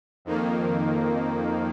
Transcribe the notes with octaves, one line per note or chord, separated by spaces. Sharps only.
F2 D#3 A#3